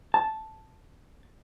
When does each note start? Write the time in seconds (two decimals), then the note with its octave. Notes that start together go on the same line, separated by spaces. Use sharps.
0.14 A5